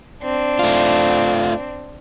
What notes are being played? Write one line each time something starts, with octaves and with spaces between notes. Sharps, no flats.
C4 D4
A3 F4